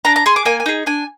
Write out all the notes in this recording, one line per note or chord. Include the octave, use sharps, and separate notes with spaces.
D4 A#5
A#5
G#4 C6
D6
A#3 G#5
G#5
D#4 G#4
D4 G#5